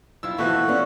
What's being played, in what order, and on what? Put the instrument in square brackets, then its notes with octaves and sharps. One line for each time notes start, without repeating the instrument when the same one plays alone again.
[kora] C4 E4 F4 [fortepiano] E6
[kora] B2 F3 [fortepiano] E3 A3 [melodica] F#4 [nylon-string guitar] E5
[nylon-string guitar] B3 C#4 D4